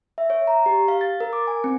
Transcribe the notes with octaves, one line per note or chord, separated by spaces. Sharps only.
E5
C#5
A#5
G4
F5
A6
A#4
D6
G#5
C4